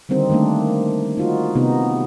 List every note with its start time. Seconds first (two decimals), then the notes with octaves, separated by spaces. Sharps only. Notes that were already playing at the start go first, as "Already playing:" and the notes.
0.09 D3 D#3 G3 C4 D#4
0.30 D#3 G3 A3 A#3 D4
1.17 D#4 F4 F#4
1.55 C3 B3 D#4